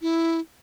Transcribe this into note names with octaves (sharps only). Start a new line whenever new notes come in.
E4